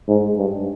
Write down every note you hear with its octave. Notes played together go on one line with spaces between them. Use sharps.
G#2
G2